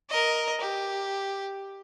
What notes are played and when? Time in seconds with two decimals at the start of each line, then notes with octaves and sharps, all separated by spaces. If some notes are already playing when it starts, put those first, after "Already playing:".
0.10 A#4 D#5
0.61 G4